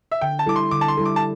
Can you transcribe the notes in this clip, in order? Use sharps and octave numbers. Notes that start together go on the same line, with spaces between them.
E5
D3 G5
A5
G3 E4 A4 D6
C6
D3 D6
A5
C6
G3 E4 A4
D6
A5